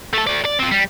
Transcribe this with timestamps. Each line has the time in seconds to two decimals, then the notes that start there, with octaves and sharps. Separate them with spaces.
0.14 A3 A4
0.27 A3 D5
0.45 D5
0.59 C4 F4
0.71 G3